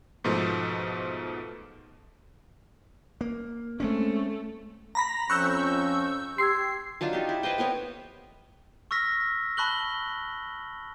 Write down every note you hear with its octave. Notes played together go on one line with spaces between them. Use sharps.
G#2 B2 F3 A3
A#3
G#3 A3 C4 C#4
A#5 B5 A#6
F2 F3 C#4 C#6 E6 F#6 G6
G4 C6 E6 G#6 C7
F#3 D4 D#4 F4
D#4 G4
E4
B4 C5 D#5 G5
B3 C4 A#4 C#5
C#6 E6 F6 A#6 B6
A5 B5 C#6 F#6 F#7 G7